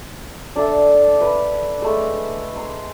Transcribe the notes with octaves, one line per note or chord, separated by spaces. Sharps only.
D4 A4 E5 A5
B4
G#3 A3
A#5 C6